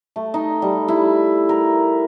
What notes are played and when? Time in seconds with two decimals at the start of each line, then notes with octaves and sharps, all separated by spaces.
0.16 A3
0.34 D#4
0.62 G3
0.88 E4
1.49 A#4